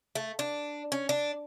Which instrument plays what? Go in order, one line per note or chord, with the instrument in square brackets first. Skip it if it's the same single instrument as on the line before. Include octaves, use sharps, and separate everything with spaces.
[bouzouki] A3
D4
C#4
D4